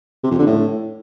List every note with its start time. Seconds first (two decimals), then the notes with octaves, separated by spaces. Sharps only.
0.24 C3
0.31 F2
0.39 D3
0.46 A2